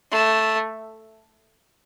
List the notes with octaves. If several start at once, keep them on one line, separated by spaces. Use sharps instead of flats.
A3